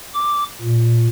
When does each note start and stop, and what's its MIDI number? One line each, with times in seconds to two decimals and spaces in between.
0.14 0.44 86
0.61 1.07 46